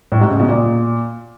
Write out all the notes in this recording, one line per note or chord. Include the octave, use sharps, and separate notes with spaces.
A2
G#2
C#3
B2
A#2